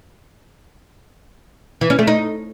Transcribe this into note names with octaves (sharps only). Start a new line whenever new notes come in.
E3
C#4
A3
D#4